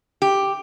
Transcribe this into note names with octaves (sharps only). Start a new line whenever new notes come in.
G4